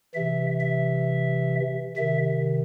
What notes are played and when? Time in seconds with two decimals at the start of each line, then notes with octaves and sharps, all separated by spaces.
0.14 C3 E3 E5
0.60 E5
1.96 C3 D#3 E5